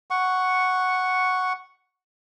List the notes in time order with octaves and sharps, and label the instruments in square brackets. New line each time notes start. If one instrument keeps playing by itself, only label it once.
[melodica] F#5 C#6